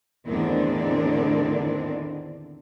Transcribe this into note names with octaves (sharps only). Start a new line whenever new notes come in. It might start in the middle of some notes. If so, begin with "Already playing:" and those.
E2 A2 D3 D#3 C4 D4